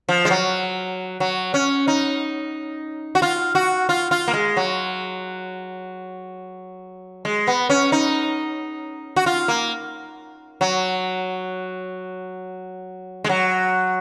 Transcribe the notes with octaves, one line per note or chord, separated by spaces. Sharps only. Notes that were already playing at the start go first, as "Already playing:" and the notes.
F3
G#3
F#3
F#3
C#4
D#4
F#4
F4
F#4
F4
F4
A#3
G#3
F#3
G#3
B3
C#4
D#4
F#4
F4
A#3
F#3
G#3
F#3